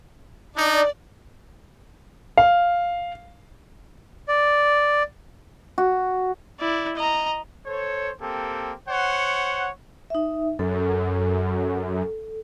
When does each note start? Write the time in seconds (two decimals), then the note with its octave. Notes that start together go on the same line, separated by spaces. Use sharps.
0.56 D4 D#4 D5
2.38 F5
4.28 D5
5.78 F#4
6.60 E4 D5
6.96 D#5 A#5
7.65 A4 C5 C#5
8.21 A#3 C4 G4 A4
8.88 C5 C#5 F#5
10.10 D#4 E5
10.59 F#2 A4